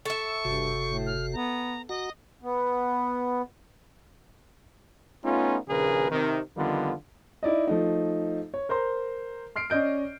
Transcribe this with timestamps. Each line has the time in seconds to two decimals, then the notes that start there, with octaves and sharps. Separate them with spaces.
0.05 A4 E5 C#6
0.45 F#1 G2 C3 F#4
0.86 A2
1.06 F6
1.33 B3 A#5
1.89 F#4 D#5 F#5 A#5
2.43 B3
5.24 A3 B3 C#4 D#4 F4
5.69 A#1 D#2 C#3 G#4 A#4 B4
6.10 C3 D#3
6.56 F2 D3 D#3 G3 B3 F4
7.43 D#4 E4 D5 D#5
7.67 F3 A3 D#4
8.54 C#5
8.69 A#4 C5 A#5 C6
9.56 C6 F6 C7 D7
9.70 C#4 D5 D#5 G6 D7